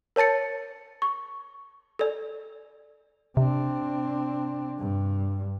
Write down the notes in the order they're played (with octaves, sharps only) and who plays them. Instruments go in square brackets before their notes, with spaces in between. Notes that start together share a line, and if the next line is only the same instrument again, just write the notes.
[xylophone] A#4 C#5 A5 A6 C#7
C#6
A4 D5
[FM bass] C3 [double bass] C4 D4
[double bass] G2